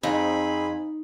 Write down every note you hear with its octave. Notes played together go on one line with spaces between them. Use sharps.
F2 C4 D#4 G#4 B5